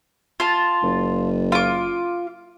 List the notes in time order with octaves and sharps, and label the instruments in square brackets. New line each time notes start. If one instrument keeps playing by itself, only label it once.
[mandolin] F4 A5
[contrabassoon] F#1
[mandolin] F4 D6